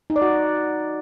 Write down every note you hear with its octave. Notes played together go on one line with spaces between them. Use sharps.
D#4
D5
F#4